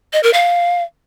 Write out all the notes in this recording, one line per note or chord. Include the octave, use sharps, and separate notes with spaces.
D#5
A#4
F5